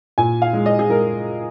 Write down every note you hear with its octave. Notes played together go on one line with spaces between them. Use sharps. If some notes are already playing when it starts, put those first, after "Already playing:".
A#2 G#5
F5
G#3
D#5
G#4
G#3 A#4